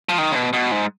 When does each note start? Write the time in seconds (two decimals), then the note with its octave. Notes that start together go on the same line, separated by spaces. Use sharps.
0.09 F3
0.18 D#3
0.32 C#3
0.36 B2
0.53 B2
0.72 G#2